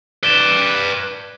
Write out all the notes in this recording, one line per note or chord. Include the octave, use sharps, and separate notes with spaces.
B4 D5 E7 G7